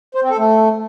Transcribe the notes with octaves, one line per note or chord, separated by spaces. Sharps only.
C5
C4
A4
A3